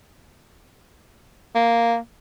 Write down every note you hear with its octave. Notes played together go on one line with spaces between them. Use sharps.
A#3